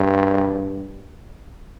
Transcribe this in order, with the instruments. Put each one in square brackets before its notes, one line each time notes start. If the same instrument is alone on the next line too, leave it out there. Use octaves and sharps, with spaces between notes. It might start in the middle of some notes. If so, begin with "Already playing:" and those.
Already playing: [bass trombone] G2